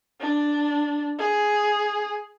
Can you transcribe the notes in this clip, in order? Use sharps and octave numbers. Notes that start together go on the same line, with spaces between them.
D4
G#4